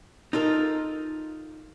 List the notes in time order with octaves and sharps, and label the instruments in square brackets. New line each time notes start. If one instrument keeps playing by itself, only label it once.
[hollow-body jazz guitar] D#4 F4 A4 A#4